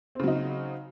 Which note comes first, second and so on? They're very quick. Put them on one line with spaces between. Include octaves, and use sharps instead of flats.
C4 C#3 F#3 D#4